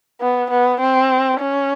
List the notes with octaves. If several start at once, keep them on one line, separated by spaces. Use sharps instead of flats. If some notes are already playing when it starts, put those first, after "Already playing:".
B3
B3
C4
C#4